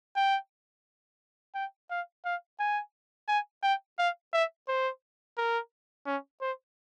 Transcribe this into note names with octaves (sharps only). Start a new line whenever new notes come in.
G5
G5
F5
F5
G#5
G#5
G5
F5
E5
C5
A#4
C#4
C5